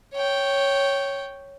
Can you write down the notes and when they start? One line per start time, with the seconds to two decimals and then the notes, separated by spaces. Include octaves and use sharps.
0.14 C#5 G5